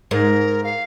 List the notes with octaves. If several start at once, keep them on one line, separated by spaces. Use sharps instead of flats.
G#2 A#4
F5